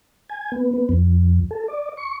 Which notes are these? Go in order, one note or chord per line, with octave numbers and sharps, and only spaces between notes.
G#5
B3
B3
F2
A4
D5
C#6